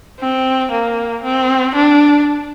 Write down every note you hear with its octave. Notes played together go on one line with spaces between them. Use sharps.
C4
A#3
C4
D4